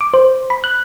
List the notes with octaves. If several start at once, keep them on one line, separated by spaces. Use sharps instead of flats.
D6
C5
B5
F#6